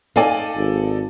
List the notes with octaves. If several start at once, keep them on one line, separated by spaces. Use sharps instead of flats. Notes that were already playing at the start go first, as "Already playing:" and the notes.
D#4 A4 D5 F5 G#5
G#1